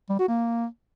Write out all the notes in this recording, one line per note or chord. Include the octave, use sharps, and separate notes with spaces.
G3
F#4
A#3